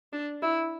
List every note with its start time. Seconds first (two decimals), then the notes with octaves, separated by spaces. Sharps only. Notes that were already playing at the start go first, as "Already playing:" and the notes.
0.13 D4
0.42 E4